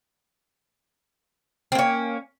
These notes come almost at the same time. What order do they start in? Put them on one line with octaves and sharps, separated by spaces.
C4 A#3 C#4